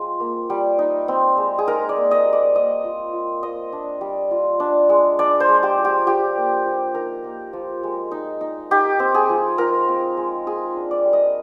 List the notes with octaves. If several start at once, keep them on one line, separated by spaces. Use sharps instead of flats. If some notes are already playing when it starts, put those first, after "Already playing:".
Already playing: G#3 C4 F4
A#3
G3
D#4
C4
G#3
G#4
D#4 A#4
D5
A#3
D#5
G3
D5
A#3 D#5
F4
F4
F4 D#5
D4
G3
F4
D4
G#3
D4 D5
C5
G#3
G4
F3
G4
F4 G4
A#3
F3
D#4 A#4
A#3
F3
G#3
D#4
D#4
D#4 G4
C4
G#4
F3
F4 A#4
C4
G#3
F4 G#4
D4
D5
G3
D#5